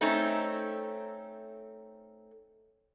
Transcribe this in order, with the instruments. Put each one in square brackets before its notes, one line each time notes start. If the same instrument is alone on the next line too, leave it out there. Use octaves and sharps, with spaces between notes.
[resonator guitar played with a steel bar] A3 C4 C#4 D#4 A4